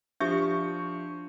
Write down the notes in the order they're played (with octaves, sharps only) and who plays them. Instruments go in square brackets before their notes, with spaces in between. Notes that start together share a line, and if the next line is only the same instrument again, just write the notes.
[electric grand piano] F3 C#6 G6 [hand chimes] D4 [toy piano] G4 E5